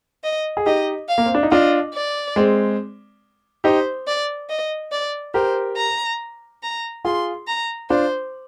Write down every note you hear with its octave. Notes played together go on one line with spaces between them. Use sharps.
D#5
G#4
D#4 G4 D#5
F5
A#3
C4
D4
D#4
D4 F4 D#5
D5
G#3 C4
D#4 G4 C5
D5
D#5
D5
G4 A#4 C5
A#5
A#5
F4 G#4 C6
A#5
D4 F4 C5